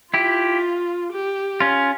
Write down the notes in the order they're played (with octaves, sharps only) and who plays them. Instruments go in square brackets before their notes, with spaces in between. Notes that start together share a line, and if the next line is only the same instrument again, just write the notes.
[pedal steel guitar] E4 G4 [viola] F4
[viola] G4
[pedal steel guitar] C#4 F4